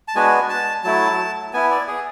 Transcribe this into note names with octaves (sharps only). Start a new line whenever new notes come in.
A5
G#3 B3 D4 F#4 G#5
A5
F#3 A3 E4 A5
B3 E4 G#5
D5
G#4